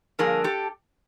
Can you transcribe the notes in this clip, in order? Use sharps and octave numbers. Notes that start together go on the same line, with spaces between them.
G2 D3 F3 A#3 D4 G#4 A#4
G4 A4